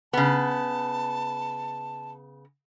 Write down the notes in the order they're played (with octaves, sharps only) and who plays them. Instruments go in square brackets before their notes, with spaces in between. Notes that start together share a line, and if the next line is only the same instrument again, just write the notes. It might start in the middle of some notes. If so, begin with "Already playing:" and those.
[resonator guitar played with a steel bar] C#3 B3 [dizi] A5